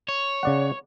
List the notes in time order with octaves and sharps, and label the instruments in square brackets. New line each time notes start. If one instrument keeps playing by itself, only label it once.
[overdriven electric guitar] C#5
[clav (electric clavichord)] C#3 D5 F#5